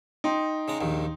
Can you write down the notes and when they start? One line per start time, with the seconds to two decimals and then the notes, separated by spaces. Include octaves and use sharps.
0.24 D#4 G5 C6
0.68 C#3 G#3 A#5
0.81 A#1 D#2 D#3